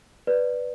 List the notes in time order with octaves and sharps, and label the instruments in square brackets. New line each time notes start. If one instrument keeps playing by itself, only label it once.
[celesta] B4 D5